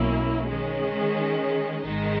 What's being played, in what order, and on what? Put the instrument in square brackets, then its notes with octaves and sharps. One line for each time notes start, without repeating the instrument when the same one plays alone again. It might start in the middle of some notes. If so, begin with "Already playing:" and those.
Already playing: [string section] B1 B2 A#3 C#4 E4
D#3 G#3 C#4 G#4
G#1 G#2 D#3 G#3 D#4